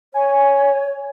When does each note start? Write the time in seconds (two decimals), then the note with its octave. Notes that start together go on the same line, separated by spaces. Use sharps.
0.14 C#5 G#5